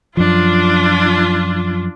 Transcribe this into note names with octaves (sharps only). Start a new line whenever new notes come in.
F#2 F3 D4 F4